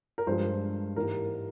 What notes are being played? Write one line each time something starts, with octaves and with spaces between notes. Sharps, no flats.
A#4
G2 F3 G#3 C5
G#2 E3 G3 A#3 A#4